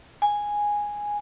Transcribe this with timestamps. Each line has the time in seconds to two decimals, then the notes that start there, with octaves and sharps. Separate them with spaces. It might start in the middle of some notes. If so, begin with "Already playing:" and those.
0.22 G#5